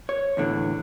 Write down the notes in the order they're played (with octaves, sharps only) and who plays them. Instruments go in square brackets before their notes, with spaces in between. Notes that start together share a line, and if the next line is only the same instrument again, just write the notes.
[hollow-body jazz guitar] C#5
E2 A2 D3